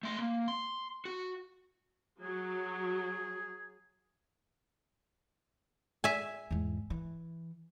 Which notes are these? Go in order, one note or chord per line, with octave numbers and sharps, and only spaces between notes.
A3 C6
A#3
C6
F#4
F#3 G#4
E5 G#5
E2 G#2
E3